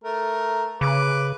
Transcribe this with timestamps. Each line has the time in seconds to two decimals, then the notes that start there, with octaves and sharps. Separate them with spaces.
0.04 A3 A#4
0.81 C#3 B4 D6